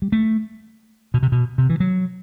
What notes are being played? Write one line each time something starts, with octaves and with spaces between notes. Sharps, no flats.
G3
A3
B2
C3
B2
C3
E3
F#3